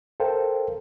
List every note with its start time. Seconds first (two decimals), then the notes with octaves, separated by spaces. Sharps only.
0.20 A4 A#4 C5 F5 G5